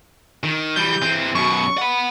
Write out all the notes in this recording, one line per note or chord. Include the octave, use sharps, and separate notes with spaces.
D#3
E3 G3 G6
E3 C4
F#2 B2 C#6
F#5 B5